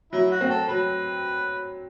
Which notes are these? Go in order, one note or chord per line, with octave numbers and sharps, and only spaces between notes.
F#3 E4
F#4
C4
A4
F#3 B4